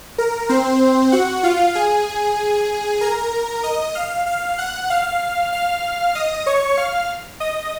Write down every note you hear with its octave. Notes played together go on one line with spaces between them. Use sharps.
A#4
C4 C5
F#4 F#5
F4 F5
G#4 G#5
A#4 A#5
D#5 D#6
F5 F6
F5 F6
F#5 F#6
F5 F6
F5 F6
D#5 D#6
C#5 C#6
F5 F6
D#5 D#6